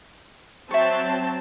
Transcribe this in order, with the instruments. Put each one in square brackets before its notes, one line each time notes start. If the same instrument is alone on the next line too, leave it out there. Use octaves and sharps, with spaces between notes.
[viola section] F#3 C4 A5 [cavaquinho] E5 C#6